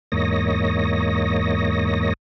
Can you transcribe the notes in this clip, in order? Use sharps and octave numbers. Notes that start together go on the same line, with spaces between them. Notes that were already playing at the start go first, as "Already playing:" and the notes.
E2 G#2 A#3 C#5 D#5 A#6